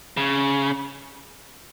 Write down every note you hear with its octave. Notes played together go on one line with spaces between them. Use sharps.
C#3